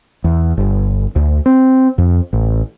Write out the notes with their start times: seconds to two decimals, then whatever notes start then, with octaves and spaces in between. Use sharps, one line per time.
0.24 E2
0.57 G1
1.16 D2
1.46 C4
1.98 F2
2.33 A1